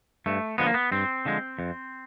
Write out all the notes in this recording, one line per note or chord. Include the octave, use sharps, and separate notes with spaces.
G2 A3
D3 F3 G#3 B3
A#3
B3
G2 C4
D3 F3 G#3
F2